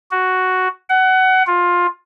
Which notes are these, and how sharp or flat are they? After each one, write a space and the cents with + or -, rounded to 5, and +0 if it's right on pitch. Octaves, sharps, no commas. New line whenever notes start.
F#4 +5
F#5 +20
F4 +15